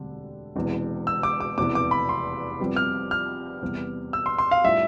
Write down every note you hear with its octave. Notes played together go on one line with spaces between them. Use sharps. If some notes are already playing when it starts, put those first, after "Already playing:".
Already playing: E1 D2 D3 G3 C4
E1 E2 C3 E3
E6
D6
D6
F1 E2 C3 E3 B3 D6
D6
B5
C6
F2 C3 G3 B3
F6
F6
E2 C3 G3 B3
E6
C6
C6
F5
A2 G3 D4 F4 E5